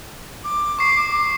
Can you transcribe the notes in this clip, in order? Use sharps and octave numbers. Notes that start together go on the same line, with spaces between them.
D6
C#6 C7